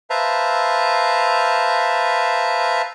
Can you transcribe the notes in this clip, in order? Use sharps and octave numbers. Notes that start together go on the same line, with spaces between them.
B4 C5 E5 F5 A5 A#5